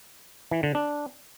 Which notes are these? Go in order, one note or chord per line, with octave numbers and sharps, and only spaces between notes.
E3
D3
D4